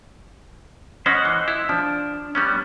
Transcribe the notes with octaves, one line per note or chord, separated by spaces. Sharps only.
C#4 C5 D#5 F#5
E3
E4
F3 D4
G3 B3 C#4